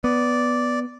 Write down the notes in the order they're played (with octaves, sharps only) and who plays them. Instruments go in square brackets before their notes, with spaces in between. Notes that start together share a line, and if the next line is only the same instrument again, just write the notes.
[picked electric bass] B3 [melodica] D5